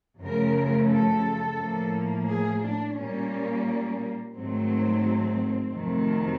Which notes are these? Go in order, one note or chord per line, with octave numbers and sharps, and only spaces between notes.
F#2 C#3 F3 A3 A#4
A4
A2 F3 A#3
G#4
D4
A#2 G3 A#3 C#4
G#2 D#3 F#3 A3 C4
F2 C3 D#3 F#3 A3